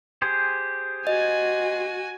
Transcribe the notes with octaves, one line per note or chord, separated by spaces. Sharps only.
G4 G#4 C5
F#4 D#5 G#5